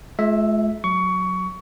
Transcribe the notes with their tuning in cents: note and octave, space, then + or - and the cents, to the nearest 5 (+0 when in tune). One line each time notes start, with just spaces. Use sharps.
G#3 +45 F4 +0 E5 +0
F#3 +0 C#6 +20